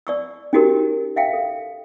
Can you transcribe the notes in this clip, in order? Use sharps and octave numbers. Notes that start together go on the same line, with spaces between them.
D5 C#6 E6
C#4 D#4 F#4 G4 A#4
E5 F5 G5
A4